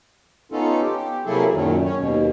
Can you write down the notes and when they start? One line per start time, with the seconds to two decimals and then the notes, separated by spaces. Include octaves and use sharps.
0.52 B3 C#4 D#4 F4 A4
0.81 G4
1.26 C3 F#3 A#3 E4 G#4 A4
1.53 F#2 A#2 D#3 F#3
1.85 C#4 C#5
1.98 D#2 B2